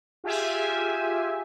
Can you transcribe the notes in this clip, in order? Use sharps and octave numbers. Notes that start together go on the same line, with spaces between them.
F4 G4 G#4 E5 G#5